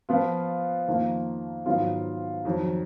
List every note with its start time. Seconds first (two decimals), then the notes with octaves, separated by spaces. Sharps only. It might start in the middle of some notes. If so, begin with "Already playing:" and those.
0.09 F3 B3 F4
0.87 F2 D#3 A#3 F4
1.66 G#2 D#3 F#3 B3 F4
2.45 F2 D#3 F#3